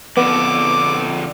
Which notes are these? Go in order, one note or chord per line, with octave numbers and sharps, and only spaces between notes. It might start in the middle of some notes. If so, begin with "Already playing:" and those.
F2 D3 B3 D6